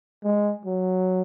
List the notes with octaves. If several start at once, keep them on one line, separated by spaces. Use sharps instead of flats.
G#3
F#3